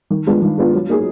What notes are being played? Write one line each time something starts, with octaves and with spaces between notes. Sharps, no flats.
D#3
G#3 B3 D4 F4
D#3
G#3 B3 D4 F4
F#3
A#3 D#4 G#4